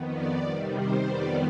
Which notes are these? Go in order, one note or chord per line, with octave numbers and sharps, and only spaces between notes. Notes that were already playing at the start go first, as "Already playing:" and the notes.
Already playing: F2 D#3 B3
D5
C3 D#3 G3
C5
F2 D#3 G3 B3 D5